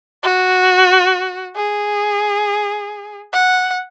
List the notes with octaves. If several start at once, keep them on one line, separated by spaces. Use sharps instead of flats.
F#4
G#4
F#5